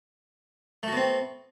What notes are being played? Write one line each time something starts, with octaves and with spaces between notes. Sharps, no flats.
A3 B3 C4 F#4